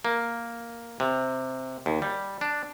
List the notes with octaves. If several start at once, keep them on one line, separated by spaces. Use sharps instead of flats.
A#3
C3
D#2
G3
D4